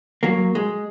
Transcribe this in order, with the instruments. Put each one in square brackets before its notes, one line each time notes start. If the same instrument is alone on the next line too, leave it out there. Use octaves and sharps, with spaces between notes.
[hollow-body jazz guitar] F#3 A#3
G#3